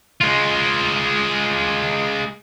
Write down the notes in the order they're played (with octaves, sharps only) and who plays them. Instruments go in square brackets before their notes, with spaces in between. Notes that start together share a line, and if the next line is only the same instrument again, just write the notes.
[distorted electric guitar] G#3 F4